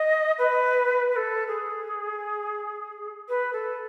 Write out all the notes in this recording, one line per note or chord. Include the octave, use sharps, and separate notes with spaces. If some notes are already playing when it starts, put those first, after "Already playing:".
Already playing: D#5
B4
B4
A4
G#4
B4
A4